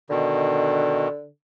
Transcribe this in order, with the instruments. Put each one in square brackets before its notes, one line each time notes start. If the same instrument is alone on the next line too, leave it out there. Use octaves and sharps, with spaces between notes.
[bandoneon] B2 D#3 [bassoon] D3